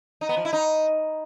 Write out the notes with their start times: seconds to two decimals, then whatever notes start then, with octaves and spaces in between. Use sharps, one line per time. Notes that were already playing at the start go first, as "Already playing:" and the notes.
0.21 D#4
0.29 B3
0.37 F3
0.45 E4
0.53 D#4